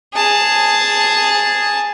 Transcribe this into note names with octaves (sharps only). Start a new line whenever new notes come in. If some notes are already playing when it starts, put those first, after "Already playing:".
G#4 A5